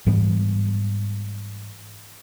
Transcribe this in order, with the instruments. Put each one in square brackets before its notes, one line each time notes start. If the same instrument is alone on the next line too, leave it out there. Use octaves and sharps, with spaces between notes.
[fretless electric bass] G#2 E3 G3 B3